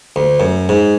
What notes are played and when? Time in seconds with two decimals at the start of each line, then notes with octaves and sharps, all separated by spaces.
0.16 D2
0.40 F#2
0.69 G#2